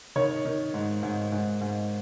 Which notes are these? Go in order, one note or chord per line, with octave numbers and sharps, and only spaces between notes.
D#3 C#5
D#3
G#2
G#2
G#2
G#2